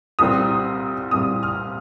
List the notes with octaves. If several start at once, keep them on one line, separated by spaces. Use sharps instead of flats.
C2 A#2 G3 C4 D#6
C2 A#2 G3 C4 D#6
F6